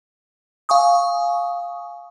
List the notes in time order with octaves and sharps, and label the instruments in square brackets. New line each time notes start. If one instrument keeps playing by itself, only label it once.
[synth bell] F5 G#5 C#6 D#6